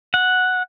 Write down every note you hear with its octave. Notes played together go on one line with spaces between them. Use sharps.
F#5